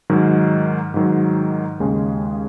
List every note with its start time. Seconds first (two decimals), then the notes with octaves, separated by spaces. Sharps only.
0.10 G#2 D#3 F#3
0.94 G#2 D#3 F#3
1.80 D#2 C#3 G#3 C#4 G#4